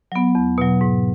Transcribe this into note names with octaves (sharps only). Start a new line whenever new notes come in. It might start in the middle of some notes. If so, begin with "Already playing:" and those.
F#3 B3
E2
B2 F#3
G#2